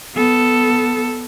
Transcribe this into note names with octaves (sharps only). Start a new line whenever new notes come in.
B3 A4